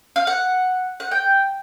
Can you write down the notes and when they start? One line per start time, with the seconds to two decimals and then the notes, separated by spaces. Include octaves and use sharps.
0.16 F5
0.27 F#5
1.00 F#5
1.11 G5